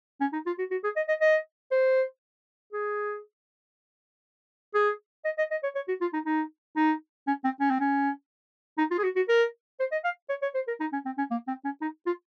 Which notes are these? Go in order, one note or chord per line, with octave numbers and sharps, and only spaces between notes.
C#4
D#4
F4
F#4
F#4
G#4
D#5
D#5
D#5
C5
G#4
G#4
D#5
D#5
D#5
C#5
C#5
F#4
F4
D#4
D#4
D#4
C#4
C4
C#4
C4
C#4
D#4
F4
G#4
F#4
F#4
A#4
C5
D#5
F5
C#5
C#5
C5
A#4
D#4
C#4
C4
C#4
A#3
C4
C#4
D#4
F4